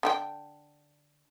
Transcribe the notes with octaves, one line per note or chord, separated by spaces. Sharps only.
D3 G4 G5